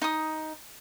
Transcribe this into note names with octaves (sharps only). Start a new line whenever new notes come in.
D#4 D#6